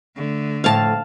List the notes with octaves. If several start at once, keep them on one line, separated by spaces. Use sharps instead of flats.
D3 A3
F2 A2 F5 A5